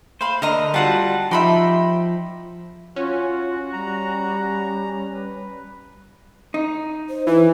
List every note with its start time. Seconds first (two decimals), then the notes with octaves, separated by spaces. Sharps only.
0.21 C5 F5 B5 C6
0.42 D3 A#4 D#5 A#5
0.74 G3 F4 F#4 F#5 A5
1.31 F3 D#4 G4 E5 B5 C6
2.96 C#4 F4 F#4
3.73 G3 A#5
5.13 B4
6.54 D#4
7.09 C5
7.27 E3 B4